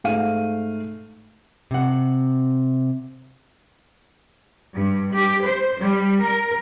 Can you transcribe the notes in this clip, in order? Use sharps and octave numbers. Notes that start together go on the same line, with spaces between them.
G#2 A3 F5 D#7
C3 F#5
G2
G4
C5
G3
A#4